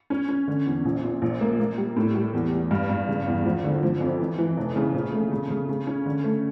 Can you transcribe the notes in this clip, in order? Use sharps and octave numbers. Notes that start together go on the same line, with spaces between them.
C#4
C#4
D3
E2
A#1
A#2
A#1
A#3
A#3
G3
A2
G3
E2
E2
G2
G2
C#3
E2
F3
D3
F3
F2
E3
E3
F1
C#3
A#1
A3
C#3
C#3
C#3
C#4
D3
A3